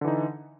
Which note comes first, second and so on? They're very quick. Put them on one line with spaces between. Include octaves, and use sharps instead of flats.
D3 E3 D#4